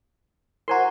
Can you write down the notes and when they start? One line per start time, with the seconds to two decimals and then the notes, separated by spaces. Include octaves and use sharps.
0.68 F#4 A#4 C5 G#5 A#5 C6